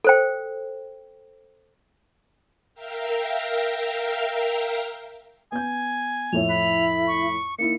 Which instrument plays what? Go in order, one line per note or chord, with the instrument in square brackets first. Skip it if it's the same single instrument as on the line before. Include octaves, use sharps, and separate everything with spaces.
[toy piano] A4 C5 G5
[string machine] A#4 E5 F5 G5 A#5
[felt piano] B3 G6 [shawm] G#5
[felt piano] F2 A2 C#5 [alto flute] E4 [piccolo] F7
[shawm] B5
[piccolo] C#6
[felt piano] A#3 D#4 E4 [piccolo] C#7